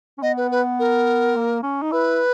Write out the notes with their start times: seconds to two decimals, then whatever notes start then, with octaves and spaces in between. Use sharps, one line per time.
0.18 C#4
0.22 B3 D#5
0.37 B4
0.51 B4
0.79 A#4
1.36 A#3
1.63 C#4
1.82 D#4
1.92 E4 B4